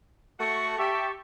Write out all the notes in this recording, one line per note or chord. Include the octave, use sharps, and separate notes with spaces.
A3 F#4 C#6
G4 E5 A5 C#6